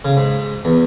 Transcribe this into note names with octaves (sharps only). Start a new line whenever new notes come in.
C#3
G#2
E2